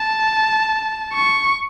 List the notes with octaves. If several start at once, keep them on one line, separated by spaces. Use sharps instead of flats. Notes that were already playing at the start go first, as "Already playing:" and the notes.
Already playing: A5
C#6